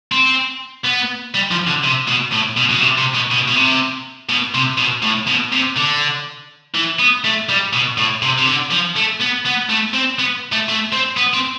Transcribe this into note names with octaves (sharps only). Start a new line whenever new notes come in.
C4
B3
G3
F3
D3
C3
B2
A2
B2
B2
C3
C3
B2
B2
B2
C3
B2
C3
B2
A2
B2
C3
D3
E3
B3
A3
G3
B2
A2
C3
C3
D3
F3
A3
B3
B3
A3
C4
B3
A3
A3
C4
B3
C4